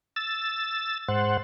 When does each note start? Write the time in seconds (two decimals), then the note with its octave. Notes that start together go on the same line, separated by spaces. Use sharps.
0.16 E6 A6
1.08 G#2 C5 F#5